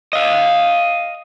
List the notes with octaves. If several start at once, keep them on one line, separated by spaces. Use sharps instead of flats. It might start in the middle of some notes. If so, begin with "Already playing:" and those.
D#5 F5